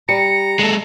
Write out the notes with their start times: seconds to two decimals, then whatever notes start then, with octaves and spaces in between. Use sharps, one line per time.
0.09 G3 A#5 C#7
0.59 G#3 A4